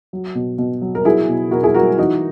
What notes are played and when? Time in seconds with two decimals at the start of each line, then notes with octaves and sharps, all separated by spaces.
0.13 F#3
0.35 B2
0.58 B2
0.82 F#3
0.95 A#4
1.05 F#3 E4 G#4
1.28 B2
1.51 B2 F#4 A#4
1.63 E4 G#4
1.74 F#3 F#4 A#4
1.98 E3 D#4 F#4